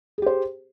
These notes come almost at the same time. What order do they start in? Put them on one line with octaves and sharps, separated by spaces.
G#4 G4 C5